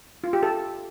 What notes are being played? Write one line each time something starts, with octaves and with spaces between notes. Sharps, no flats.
F4
G4
A4